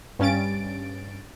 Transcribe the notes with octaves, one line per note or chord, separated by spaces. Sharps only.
G2 C#4 A6 D7